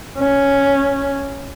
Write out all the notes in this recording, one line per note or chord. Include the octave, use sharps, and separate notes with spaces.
C#4